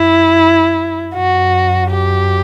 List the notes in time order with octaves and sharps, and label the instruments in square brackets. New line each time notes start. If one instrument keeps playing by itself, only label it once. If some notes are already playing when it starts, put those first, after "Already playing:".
Already playing: [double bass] F#2 [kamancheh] E4
[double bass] F#2 [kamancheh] F#4
[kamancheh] G4